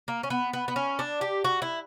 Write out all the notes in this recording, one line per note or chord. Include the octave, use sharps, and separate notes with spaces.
A#3
C#4
B3
B3
B3
C#4
D4
G4
F#4
E4